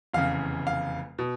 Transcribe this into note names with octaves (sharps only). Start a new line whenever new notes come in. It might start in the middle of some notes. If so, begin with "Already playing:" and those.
F1 E2 C#3 F5
F5
B2